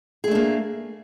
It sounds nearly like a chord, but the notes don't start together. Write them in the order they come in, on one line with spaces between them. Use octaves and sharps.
G#4 A3 D4 A#3